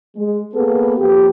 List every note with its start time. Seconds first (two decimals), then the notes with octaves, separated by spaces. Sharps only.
0.16 G#3
0.53 A#3 B3 G#4 A4 B4
0.97 F2 A#3 G4